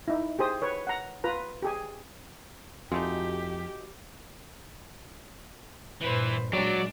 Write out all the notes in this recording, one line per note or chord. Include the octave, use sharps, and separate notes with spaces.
D#4 E4
G4 G#4 C5 D#6
B4 C#5
F#5 A#5
F4 B4 A#5
G4 G#4 G#5
F2 G#3 A3 D#4 F#4 G4
G2 A#2 E3 B4 C5
A#2 F#3 G#3 D4 D5